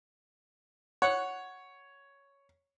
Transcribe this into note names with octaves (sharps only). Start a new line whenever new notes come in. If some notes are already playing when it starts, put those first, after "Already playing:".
C#5 F#5